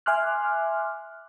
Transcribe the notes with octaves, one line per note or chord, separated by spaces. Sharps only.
E5 G#5 C6 D6 F6 F#6